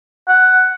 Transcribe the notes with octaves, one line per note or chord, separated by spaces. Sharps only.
F#5